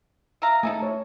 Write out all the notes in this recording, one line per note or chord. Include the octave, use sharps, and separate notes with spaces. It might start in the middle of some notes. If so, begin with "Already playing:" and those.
E5 F5 A#5
A3 D#4 E4 G#4 A5
C#5